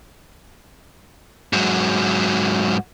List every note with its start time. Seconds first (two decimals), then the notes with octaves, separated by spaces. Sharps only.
1.53 G#2 F#3